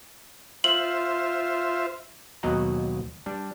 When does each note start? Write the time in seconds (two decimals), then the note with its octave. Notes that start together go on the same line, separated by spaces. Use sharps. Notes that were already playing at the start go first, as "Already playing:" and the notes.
0.64 F4 C5 E5 F#7
2.43 D#2 B2 F#3 D#5 F#5 A#5
3.26 G3 D4